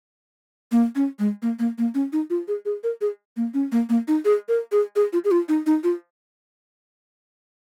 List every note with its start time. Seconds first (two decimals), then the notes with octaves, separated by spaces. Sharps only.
0.72 A#3
0.96 C#4
1.19 G#3
1.42 A#3
1.59 A#3
1.78 A#3
1.95 C#4
2.13 D#4
2.30 F4
2.48 G#4
2.65 G#4
2.84 A#4
3.01 G#4
3.37 A#3
3.54 C#4
3.72 A#3
3.89 A#3
4.08 D#4
4.25 G#4
4.48 A#4
4.72 G#4
4.96 G#4
5.13 F4
5.25 G#4
5.31 F4
5.49 D#4
5.66 D#4
5.84 F4